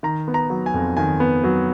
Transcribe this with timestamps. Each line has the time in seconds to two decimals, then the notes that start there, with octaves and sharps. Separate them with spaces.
0.03 D#3 A#5
0.28 B3
0.34 A#5
0.50 F#3
0.66 G#5
0.74 F2
0.97 D#3 G#5
1.20 B3
1.44 F#3